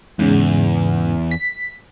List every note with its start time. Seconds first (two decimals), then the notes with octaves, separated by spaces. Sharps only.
0.19 E2 G#2 C#3
1.31 B6